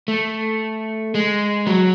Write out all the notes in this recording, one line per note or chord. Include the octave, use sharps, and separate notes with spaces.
A3
G#3
F#3